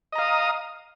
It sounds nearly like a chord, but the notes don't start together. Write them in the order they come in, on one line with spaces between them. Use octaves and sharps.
D#5 A#5 F5 D#6